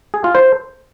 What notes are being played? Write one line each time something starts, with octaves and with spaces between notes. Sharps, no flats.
G#4
F4
C5